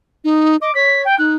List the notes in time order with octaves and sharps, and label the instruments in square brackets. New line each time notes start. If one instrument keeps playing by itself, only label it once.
[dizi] D#4
[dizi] D#5 [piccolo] D6
[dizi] C#5 [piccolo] B6
[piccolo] G5
[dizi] D#4 [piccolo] F#6